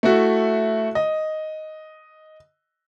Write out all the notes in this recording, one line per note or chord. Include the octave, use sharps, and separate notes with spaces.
A3 E4 F#4
D#5